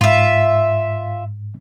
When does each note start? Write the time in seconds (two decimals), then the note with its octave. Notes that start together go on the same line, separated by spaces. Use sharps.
0.01 G#2 F4 E5